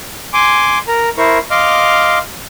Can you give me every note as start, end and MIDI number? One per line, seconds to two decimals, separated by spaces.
0.33 0.79 80
0.33 0.79 84
0.33 0.79 86
0.88 1.10 70
0.88 1.10 82
1.18 1.39 64
1.18 1.39 70
1.18 1.39 72
1.18 1.39 85
1.51 2.18 75
1.51 2.18 77
1.51 2.18 84
1.51 2.18 86
1.51 2.18 89